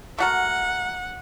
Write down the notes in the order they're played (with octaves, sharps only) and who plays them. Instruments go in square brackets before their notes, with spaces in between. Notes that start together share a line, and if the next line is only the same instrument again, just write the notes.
[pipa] A3 F#4 A#4 [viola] F#5